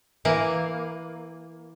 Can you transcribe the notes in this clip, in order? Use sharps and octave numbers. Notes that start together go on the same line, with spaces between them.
E3 A#3